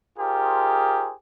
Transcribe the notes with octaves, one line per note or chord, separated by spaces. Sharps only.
D#4 F4 G4 G#4 A#4 C5